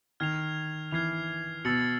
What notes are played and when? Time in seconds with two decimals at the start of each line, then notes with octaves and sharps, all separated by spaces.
0.20 D#3 F6 G#6 C7 F7
0.91 E3 F6 G#6 C7 F7
1.65 B2 E6 A6 C#7 F#7